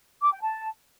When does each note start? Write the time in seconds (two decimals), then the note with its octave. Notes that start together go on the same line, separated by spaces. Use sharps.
0.21 D6
0.31 G5
0.42 A5